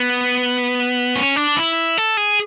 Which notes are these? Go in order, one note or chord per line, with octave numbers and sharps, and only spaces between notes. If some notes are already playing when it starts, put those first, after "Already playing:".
Already playing: B3
C#4
D4
E4
A4
G#4